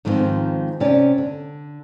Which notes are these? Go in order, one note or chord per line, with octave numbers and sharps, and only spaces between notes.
G#2 D#3 F3 G3 B3 C4
C3 C#4 C#5 D5 G#5
D3